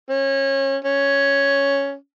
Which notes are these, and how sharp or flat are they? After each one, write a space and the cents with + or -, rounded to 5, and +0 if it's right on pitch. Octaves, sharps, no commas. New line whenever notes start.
C#4 -25
C#4 +5